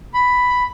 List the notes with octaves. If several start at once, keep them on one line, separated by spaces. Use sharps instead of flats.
B5